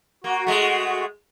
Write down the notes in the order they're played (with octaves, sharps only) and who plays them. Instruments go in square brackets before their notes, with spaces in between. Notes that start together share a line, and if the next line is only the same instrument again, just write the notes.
[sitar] A#3 [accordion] F#4
[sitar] G#3 A3